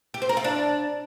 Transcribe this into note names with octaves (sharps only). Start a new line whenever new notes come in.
G4
C5
A#4
F4
D4